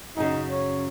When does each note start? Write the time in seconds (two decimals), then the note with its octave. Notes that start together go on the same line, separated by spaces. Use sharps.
0.17 F#2 C#3 D#4
0.50 C#5